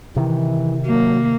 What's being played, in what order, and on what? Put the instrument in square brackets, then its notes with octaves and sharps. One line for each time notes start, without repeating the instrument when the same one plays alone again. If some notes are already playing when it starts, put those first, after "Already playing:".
[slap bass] C3 D#3 [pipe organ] E3
[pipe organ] F#3 [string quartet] A#3